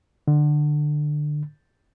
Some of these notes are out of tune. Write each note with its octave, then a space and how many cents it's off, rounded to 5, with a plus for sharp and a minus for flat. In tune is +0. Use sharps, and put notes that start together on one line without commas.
D3 +20